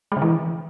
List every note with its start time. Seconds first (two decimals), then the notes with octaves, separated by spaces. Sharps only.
0.12 G#3
0.17 C#3
0.22 E3